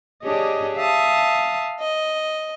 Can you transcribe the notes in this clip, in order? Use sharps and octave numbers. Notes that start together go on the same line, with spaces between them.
D4 G4 G#4 C#5 D#5
E5 F5 A5 D#6
D#5